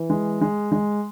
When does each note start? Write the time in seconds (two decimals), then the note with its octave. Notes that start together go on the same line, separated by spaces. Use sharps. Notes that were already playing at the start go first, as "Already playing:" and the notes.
Already playing: E3
0.10 G#3
0.41 G#3
0.72 G#3